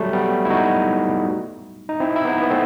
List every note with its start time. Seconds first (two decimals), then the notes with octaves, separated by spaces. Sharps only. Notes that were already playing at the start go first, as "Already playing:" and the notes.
Already playing: F#3 G3 A3
0.13 G3 B3
0.45 E4
0.50 D#4 F#4
1.89 D#4
2.00 C4 E4
2.16 E4
2.25 B3 D#4
2.41 B3
2.50 A3 C4